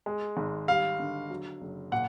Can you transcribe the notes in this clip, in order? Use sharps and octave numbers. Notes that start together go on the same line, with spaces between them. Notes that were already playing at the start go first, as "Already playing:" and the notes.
G#3
G#1
G3 F5
D3
F#3
F#1
A#2 F#5